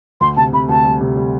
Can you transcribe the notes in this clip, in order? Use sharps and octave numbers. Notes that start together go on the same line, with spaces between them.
D2 C6
C3 A5
C3 B5
D2 A5
G3
C3
G3